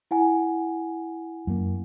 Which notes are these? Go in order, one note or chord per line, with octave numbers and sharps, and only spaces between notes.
E4 F#5 G#5
F#2 A#3